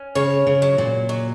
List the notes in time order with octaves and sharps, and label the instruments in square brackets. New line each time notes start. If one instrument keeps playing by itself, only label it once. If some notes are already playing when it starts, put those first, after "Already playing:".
Already playing: [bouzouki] C#4
[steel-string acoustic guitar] C#3 [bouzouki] C#5
[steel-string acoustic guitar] C#3
[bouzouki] F#3
[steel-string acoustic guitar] A#2
[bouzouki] F#3